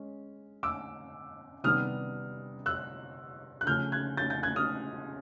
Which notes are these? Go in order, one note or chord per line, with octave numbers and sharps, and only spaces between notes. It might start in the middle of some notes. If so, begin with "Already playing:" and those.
Already playing: G#3 C#4
D6 E6
C3 D#3 G3 B3 D#6 F6
E6 F#6
F#6
C#3 F3 A3 C#4 F6 G6
F#6 G#6
G6 A6
G6 A6
F#6 G#6
D#6 F6